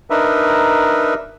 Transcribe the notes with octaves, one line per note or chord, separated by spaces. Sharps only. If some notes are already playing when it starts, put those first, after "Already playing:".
D4 D#4 A#4 B4 E5